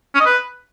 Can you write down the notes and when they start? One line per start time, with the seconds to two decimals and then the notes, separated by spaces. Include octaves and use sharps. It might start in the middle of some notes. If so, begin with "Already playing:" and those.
0.15 C#4
0.20 D#5
0.26 B4